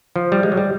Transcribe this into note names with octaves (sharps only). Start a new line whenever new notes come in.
F3
G3
G#3
F#3
G3